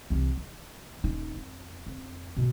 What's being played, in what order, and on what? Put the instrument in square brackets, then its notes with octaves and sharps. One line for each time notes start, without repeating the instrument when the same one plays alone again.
[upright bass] C2 E3
D#3
D#1 D#4
F2
F2
G#2 B2